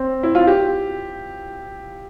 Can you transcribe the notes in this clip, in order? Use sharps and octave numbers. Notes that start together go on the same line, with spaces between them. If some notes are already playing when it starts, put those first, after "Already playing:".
Already playing: C4
E4
F4
G4